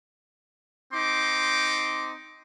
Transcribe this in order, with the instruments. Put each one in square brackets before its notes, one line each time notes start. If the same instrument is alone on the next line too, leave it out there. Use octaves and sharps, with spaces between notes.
[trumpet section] C4 D#4 C6 D6